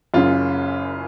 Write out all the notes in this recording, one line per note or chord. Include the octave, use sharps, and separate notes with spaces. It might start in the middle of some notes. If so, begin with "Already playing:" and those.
F#1 F#2 C#3 F4